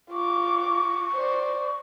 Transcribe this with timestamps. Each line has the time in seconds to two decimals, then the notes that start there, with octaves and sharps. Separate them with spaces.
0.11 F4 C#6 D6
1.14 C5 D5